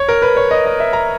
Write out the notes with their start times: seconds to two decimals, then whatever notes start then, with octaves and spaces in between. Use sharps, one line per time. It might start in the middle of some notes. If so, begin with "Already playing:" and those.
Already playing: C#5
0.09 A#4
0.22 B4
0.36 C#5
0.51 D#5
0.66 D#5
0.80 E5
0.93 A#5